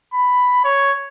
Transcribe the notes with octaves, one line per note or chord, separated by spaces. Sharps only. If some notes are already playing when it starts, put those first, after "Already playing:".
B5
C#5